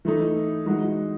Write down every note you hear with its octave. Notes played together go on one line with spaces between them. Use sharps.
E3 A3 D#4
E3 G#3 D#4 F#4